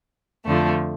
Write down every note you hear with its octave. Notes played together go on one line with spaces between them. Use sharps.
F2 D3 F3 A3